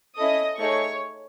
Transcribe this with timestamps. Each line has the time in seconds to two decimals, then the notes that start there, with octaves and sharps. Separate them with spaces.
0.18 C#4 E4 A4 D#5 D#6
0.60 A3 D#4 G#4 C#5 C#6